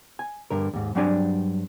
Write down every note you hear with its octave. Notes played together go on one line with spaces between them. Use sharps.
G#5
G2 D3 A#4
D#2 G#2
G2 F#3 C4 D4 D5 G#5